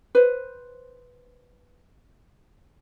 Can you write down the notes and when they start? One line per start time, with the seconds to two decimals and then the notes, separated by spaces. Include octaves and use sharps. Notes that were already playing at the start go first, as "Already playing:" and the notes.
0.15 B4 C5